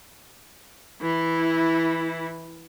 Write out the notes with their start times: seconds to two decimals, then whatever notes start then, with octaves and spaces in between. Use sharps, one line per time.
1.01 E3 E4